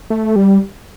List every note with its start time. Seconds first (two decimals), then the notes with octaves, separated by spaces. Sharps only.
0.10 A3
0.36 G3